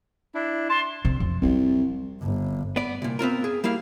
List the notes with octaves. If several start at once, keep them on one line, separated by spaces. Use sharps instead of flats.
D4 E4
A5 C6
C3
F2
C2 F3 F#3
G1
B3 D5
C2 A#2
B3 C4 F4 A#4
G#4
G3 A#3 E4 F5